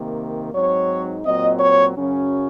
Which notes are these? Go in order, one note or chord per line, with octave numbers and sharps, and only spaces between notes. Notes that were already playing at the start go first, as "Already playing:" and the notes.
Already playing: C3 D#3 A#3
G#2 F#3 C4 D#4 C#5
A#2 F#3 C4 D#5
C#5
F#2 C#3 F#3 C#4